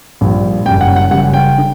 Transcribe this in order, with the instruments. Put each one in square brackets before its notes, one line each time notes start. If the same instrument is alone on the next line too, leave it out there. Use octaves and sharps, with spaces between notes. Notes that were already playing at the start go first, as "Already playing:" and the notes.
[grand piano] A#1 A#2 G3
F#1 F#2 C#3 G3 G5
F#5
F#5
F#1 F#2 C#3 G3 F#5
G5
D3